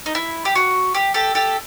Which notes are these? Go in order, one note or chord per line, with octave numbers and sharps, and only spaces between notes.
D#4
E4
G4
F#4
G4
G4 A4
G4 A4